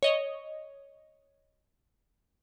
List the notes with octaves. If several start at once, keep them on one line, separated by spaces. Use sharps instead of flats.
C#5 D#5